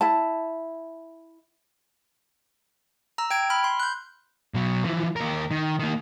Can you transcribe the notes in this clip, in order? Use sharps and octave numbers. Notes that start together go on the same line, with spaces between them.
E4 A5
A#5 E6
G5 G#6 D7
B5 F6
C6
F#6 G6
B2 F#3
E3 F3
D#2 A#4
D#3
D#3 A#3